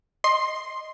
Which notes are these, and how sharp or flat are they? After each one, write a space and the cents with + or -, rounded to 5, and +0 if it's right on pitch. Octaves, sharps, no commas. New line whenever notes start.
D#5 +0 C6 +10